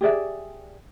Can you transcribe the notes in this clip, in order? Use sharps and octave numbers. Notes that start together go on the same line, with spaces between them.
G4 G#4 D5 E5